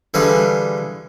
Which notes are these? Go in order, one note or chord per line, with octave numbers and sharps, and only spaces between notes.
D3 E3 G3 F4 G#4